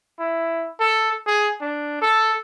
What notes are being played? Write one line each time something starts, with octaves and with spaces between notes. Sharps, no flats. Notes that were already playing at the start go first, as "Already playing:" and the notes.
E4
A4
G#4
D4
A4